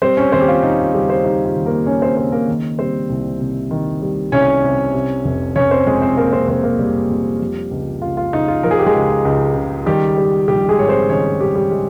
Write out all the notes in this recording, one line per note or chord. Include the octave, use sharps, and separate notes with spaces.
G3 C4 C5
C#4 C#5
D#2 C4 C5
G4
F4
D#2 D#4
F4
C#3 G3 G4
C4 C5
G3 D#4
F4
D#2
A#3 A#4
D#2 C#4 C#5
C4 C5
C#3 C4 C5
A#3 A#4
D#3
G3 C4 C5
C2
C3
D#3
G3
C2 C#4 C#5
C3
C3
F1
F1 C#4 C#5
C4 C5
F2 G#3 G#4
C4 C5
C3 A#3 A#4
C4 C5
F1 C4 C5
A#3 A#4
F1 G3 G4
F2
F3
C#2
C#2 F4
F4
C#3 D#4
F4
F3 A#4
G#4
G4
G#3 G#4
C#2
C#2
C#3
D#3 G3 G4
G3
A#1 G3 G4
G#3 G#4
G#2 C#5
C4 C5
D#3 C#4 C#5
G3 G4
G3 G4
G#3 G#4